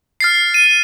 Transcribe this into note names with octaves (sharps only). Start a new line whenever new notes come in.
F6 A6 C7
D#7